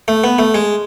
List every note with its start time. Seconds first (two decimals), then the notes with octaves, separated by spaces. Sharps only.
0.08 A3
0.24 B3
0.39 A3
0.55 G#3